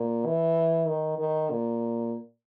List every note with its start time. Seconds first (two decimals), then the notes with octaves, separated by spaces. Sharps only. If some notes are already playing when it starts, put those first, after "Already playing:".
Already playing: A#2
0.26 E3
0.88 D#3
1.19 D#3
1.50 A#2